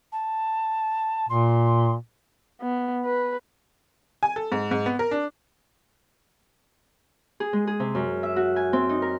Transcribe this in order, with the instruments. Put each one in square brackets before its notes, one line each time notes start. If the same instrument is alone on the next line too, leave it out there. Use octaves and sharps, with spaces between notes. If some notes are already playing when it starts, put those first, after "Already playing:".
[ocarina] A5
[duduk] A#2 [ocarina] C6
[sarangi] B3
B4
[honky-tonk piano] G#5
A4
G#2
G#2
B3
A#4
D4
[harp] G#4
G#3
G#4
C3
F#2
E5
F#4
G#5
C4
D#4
A#4